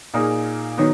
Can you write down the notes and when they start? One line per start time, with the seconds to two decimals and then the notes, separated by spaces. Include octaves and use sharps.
0.14 A#2 A#3 D#4 G#4
0.78 D#3 F#3 B3 D#4